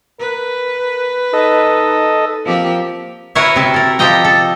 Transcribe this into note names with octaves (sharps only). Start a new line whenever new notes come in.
A#4 B4
D#4 A4 D#5
F3 A#3 C4 G4
E4 F#4 A#4 B4 C#5 E5
C3 E4 E5
A4 A#4
F3 G4 A4 D#5 G5 A#5
A4